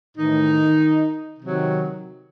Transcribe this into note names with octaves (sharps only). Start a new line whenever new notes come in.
A2 D#3 E3 D#4
C3 D#3 F#3